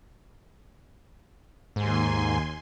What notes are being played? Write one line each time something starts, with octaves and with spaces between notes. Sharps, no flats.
D#2 G#2 G#5 C6